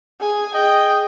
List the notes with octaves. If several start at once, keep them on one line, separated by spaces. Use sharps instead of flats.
G#4 G#5
G#4 D#5 G5